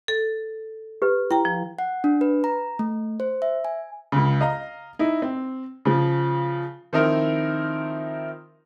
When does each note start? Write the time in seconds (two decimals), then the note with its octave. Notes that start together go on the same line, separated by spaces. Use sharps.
0.08 A4
1.02 G4 B4
1.31 E4 G5 A#5
1.45 F3
1.79 F#5
2.04 D4
2.21 B4
2.44 A#5
2.79 A3
3.20 C5
3.42 E5
3.65 G#5
4.12 C#2 C#3
4.41 D#5 F5 A#5
4.99 D#4 E4
5.22 C4
5.85 C#3 F3
6.93 D#3 F3 C4 D#4 E4 A#4